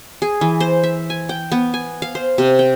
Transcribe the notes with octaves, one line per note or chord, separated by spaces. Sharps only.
G#4
E3
C5
E5
G#5
G5
B3
G#5
F5
C5
C3
G5